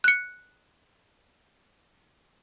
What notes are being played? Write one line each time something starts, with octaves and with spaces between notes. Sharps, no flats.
F#6 C#7